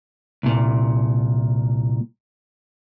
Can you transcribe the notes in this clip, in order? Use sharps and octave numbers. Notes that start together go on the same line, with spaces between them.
C2 A#2